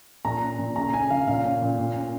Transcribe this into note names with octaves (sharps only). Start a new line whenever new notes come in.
A#2 A#5
C#4
A#2
C#3 A#5
C#4 G#5
C#3 F5
A#2 F5
C#4
A#2
A#2
C#4